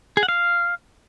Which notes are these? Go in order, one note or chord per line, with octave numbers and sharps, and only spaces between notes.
G#4
F#5
F5